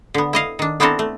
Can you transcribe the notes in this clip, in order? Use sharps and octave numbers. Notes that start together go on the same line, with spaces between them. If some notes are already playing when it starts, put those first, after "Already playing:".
D3 B3
E4 D#5 F5
D#3 D4
B3 C4 D4 E4 A4 A#4
A3